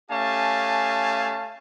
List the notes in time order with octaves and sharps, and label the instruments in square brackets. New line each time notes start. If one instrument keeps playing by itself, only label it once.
[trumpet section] A3 C#4 G4 F5 G#5 A5